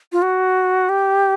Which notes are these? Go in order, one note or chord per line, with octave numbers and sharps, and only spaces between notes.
F4
F#4
G4